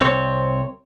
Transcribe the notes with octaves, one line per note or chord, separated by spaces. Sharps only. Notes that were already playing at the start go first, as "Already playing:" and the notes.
C2 C4 C#5